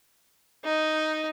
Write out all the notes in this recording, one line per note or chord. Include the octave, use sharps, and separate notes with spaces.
D#4